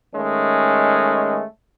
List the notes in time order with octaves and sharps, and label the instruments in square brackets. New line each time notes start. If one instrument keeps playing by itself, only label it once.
[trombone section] D#3 G#3 A3 C#4